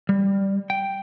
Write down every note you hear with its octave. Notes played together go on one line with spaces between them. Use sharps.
G3
G5